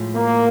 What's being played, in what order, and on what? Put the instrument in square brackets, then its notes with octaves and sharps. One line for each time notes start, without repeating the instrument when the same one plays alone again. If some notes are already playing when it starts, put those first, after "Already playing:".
Already playing: [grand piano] A2 F3 G#3
[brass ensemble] A#3